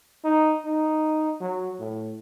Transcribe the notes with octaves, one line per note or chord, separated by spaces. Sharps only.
D#4
D#4
F#3
A2